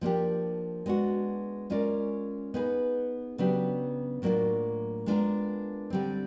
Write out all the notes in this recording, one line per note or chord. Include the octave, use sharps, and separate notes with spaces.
F3 A#3 D4 G4
G#3 B3 D4 F#4
G#3 C#4 F4 A#4 D5
B3 D#4 G#4 B4
C#3 F#3 B3 D4 G4
A2 F#3 A#3 D4 F4
G#3 B3 D4 F4 A#4
D3 G3 C4